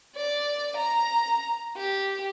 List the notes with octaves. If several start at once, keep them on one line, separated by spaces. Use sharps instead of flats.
D5
A#5
G4